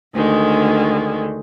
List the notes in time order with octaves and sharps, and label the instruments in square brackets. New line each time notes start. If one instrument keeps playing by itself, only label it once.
[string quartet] D2 D3 D#3 G#3